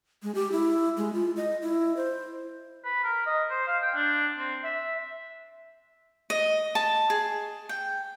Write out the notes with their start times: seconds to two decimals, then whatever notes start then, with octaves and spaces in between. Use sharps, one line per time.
0.23 G#3
0.35 G4
0.52 E4
0.97 G#3
1.13 F4
1.37 D#5
1.62 E4
1.97 C5
2.85 B4
3.04 A#4
3.26 D#5
3.50 C5
3.67 F5
3.82 G5
3.95 D4
4.38 C4
4.64 E5
6.30 D#5
6.75 A5
7.10 G#4
7.69 G5